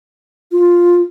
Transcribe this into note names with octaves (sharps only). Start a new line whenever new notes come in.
F4